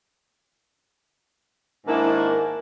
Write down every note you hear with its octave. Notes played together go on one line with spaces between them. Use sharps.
G#2 D#3 A#3 D4 E4